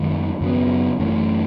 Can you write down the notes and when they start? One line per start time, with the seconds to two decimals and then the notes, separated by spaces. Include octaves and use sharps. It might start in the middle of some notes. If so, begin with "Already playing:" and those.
Already playing: F#2 D#3 G#3
0.41 F#2 C#3 F#3 B3
0.99 F#2 E3 A3 C#4